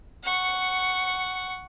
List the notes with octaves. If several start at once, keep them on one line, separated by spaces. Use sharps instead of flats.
F#5 C#6